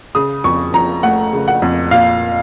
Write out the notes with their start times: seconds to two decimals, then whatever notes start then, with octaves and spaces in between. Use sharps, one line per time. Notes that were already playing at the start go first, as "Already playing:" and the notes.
0.15 C#3 D#6
0.44 F2 C#6
0.74 F2 A#5
1.03 A3 F#5
1.33 C#3
1.48 F#5
1.62 F2
1.91 A#2 F5